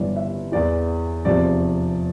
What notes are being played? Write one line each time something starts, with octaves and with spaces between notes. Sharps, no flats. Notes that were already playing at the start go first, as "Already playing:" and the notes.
Already playing: G1 G2 E3 D5
E5
E2 E3 D5
F1 E2 C3 F3 D5